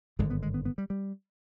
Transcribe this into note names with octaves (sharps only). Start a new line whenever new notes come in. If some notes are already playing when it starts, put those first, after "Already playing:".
G#1 G2 D3 G#3
B3
G#3
B3
B3
G3
G3